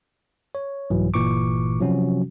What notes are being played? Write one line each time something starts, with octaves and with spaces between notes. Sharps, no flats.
C#5
C2 G#2 E3 F#3
G1 A#2 E3 C#6 D6
C3 F3 F#3 C#4 F#4